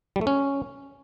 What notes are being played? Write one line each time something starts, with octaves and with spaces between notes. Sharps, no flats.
G3
A3
C#4